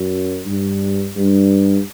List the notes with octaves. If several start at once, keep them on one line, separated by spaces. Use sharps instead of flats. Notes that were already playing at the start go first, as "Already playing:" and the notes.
Already playing: F#2
G2
G2